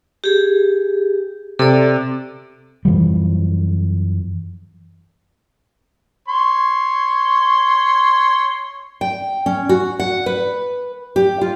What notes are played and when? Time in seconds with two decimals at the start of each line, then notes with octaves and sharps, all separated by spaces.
0.24 G4 G#4
1.59 C3 A4 D5
2.85 F#2 E3 F3 G3
6.28 C#5 C6
9.01 G5
9.46 C#4
9.69 F#4
10.00 F#5
10.26 B4
11.16 G4
11.41 F4